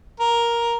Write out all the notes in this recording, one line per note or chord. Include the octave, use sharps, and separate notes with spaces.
A#4